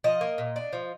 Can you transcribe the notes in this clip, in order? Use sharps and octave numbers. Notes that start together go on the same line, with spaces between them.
F3 D#5
A#3
A#2
D4
F3